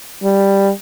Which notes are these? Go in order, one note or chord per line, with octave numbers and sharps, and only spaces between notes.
G3